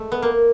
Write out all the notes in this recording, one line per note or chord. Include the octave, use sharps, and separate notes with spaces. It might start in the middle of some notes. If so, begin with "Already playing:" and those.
Already playing: G#3 A3
B3
A#3